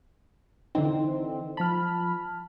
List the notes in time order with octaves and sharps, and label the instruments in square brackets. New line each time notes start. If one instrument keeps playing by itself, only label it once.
[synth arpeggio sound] D3 E3 C4 [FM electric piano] D#4
[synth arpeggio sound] F3 B5 [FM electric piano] A5 F6